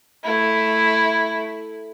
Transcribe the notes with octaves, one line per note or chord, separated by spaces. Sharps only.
A3 E4